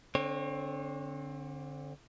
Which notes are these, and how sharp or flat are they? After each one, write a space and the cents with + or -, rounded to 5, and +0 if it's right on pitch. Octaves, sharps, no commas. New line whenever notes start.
D3 -10 C4 +20 C#5 -20